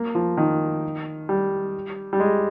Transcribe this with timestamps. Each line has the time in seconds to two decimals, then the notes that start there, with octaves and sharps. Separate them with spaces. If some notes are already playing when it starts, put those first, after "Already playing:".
Already playing: A#3
0.15 F3
0.37 D#3
1.29 G3
2.13 G3
2.20 G#3